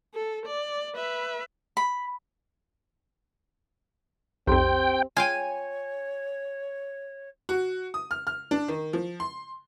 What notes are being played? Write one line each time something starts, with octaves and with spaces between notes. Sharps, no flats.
A4
D5
B4 E5
B5
B1 F2 C4 G4 G5 C6
F4 C#5 F5 G5 G#5
F#4
D#6
F6
F6
D4
D#3
F3
C6